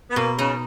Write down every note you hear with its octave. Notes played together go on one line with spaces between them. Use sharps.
B3
B2 A#3
C#3 D#4